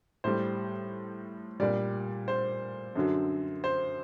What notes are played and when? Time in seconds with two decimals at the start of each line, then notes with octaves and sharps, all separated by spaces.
0.24 A2 G3 C5
1.60 A#2 G3 D5
2.28 C5
2.96 F#2 D3 F#3
3.64 C5